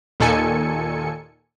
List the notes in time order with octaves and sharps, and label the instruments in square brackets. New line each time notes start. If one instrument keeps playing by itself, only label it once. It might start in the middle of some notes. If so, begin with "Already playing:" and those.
[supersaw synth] D#2 A#2 D#3 A4 G#5 C#7